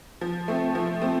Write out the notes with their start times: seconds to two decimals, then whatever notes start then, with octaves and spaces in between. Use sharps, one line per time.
0.21 F3
0.48 A3 C4
0.75 F3
1.01 A3 C4